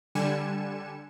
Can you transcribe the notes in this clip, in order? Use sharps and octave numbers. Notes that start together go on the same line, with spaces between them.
D3 G3 G#5 C#7 E7